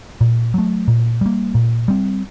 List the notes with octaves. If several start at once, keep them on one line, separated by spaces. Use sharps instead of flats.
A#2
F#3 A3
A#2
G3 A#3
A#2
G3 C4